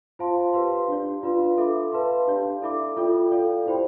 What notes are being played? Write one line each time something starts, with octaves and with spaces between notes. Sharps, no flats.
F4 C5 F5 A5 C6
G4 B4 F5 C6
D4 G4 D5
D4 F4 B4 F5 C6
A4 E5 B5 D6
B4 F5 A5 C6
D4 G4 D5 F5
E4 A4 E5 B5 D6
F4 A4 D5 G5
A4 D5 F5
E4 G4 C5 G5 B5